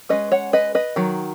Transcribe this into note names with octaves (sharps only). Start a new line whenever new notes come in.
G#3 C#4 B4 D#5
C#5 F#5
B4 D#5
B4 D#5
D#3 F#3